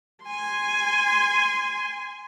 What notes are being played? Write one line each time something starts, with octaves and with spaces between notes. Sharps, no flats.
G#5 C6